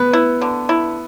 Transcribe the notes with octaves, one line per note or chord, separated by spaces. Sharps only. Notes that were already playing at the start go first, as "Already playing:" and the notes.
Already playing: B3 B4
E4
D3
E4